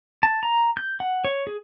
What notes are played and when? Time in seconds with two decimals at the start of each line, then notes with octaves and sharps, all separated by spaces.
0.23 A5
0.43 A#5
0.77 G6
1.00 F#5
1.25 C#5
1.47 G#4